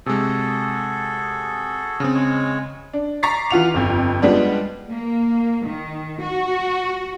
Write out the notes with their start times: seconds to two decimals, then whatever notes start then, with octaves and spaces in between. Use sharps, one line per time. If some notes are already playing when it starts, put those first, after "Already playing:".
0.06 C3 G#3 F#4 G#4 A4
2.00 C#3 C4
2.14 G#3 C#5
2.93 D4
3.23 A#5 C#6 D6 A6 B6 C7
3.50 E3 F4 F#5 F7
3.74 G1 F2
4.22 F3 G3 G#3 B3 D4
4.89 A#3
5.65 D#3
6.22 F#4